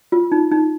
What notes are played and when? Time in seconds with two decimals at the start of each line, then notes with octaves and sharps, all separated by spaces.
0.12 F4
0.32 D#4
0.51 D#4